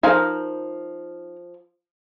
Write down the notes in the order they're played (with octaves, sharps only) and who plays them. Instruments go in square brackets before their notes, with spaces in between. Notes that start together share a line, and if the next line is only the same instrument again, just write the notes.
[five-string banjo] F3 F5 G#5 [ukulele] D#4 A#4